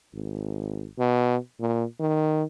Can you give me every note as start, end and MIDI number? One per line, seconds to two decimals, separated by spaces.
0.13 0.86 32
0.99 1.37 47
1.60 1.84 46
2.00 2.44 51